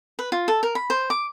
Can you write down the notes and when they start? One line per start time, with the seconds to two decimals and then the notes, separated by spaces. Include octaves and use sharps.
0.19 B4
0.32 F4
0.48 A4
0.63 A#4
0.75 B5
0.90 C5
1.10 D6